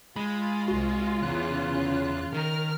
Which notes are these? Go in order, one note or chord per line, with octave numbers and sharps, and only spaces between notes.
G#3 F4 B5
C2 F#4
E2 C#3 F#6
D#3 A#4 F6